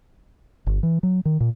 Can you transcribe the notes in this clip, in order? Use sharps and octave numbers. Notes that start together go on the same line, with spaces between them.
G1
E3
F#3
D#3
A#2